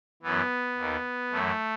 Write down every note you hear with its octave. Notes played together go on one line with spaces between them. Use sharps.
F#2 E3 B3
D#2 D#3
F#2 E3 A3